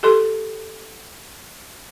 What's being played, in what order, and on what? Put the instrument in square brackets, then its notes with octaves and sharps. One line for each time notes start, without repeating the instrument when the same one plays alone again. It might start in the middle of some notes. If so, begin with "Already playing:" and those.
[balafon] G4 A4 C6